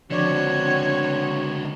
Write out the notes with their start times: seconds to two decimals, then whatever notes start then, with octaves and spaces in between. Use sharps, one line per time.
0.10 C#2 D3 F3 C4 D4 F#4 C#5 D5